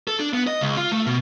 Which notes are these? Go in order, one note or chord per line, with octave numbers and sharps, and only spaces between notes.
A4
D4
B3
D#5
C#2
F4
A3
B2